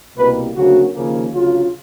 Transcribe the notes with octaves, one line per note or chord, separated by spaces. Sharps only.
C2 B2 G3 A#3 B4
D2 C#3 F#3 A#3 F#4
D#2 C#3 F3 A#3
D2 C#3 F#3 F4